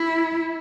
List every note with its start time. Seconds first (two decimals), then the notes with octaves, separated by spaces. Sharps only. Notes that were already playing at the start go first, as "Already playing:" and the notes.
Already playing: E4